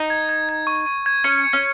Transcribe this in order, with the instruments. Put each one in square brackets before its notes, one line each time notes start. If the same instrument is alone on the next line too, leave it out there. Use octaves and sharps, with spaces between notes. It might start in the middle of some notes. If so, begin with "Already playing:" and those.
Already playing: [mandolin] D#4
[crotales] G#6
G#6
G#6
C#6
C#6
G#6
[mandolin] C#4 [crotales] C#7
[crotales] C#7
[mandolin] C#4